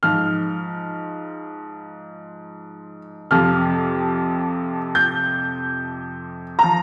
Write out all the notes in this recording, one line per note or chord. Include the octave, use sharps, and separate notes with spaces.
G#2 F3 F6
F2 C3 F3 F6
G6
F3 A#5